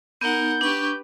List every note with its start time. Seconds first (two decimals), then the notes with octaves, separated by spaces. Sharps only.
0.21 B3 D#4 A#4 F#5 G6
0.61 D4 G4 B4 C#6